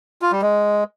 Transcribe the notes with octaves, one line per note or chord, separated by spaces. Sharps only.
F4
G3
G#3